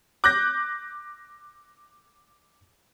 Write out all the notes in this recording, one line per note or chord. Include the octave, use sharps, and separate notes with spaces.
D6 F#6 G6 A#6